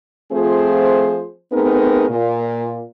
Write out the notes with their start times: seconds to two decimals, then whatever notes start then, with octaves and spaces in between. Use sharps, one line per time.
0.32 F3 A3 C4 F4 G#4 C5
1.52 A3 B3 C4 D#4 G#4 A#4
2.09 A#2